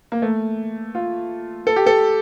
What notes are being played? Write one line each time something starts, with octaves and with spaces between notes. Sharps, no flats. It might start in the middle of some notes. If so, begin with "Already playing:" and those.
A#3
A3
F4
A4
G4
A4